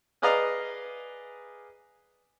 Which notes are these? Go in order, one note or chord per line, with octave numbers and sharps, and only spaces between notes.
G#4 B4 D5 D#5 F5 A#5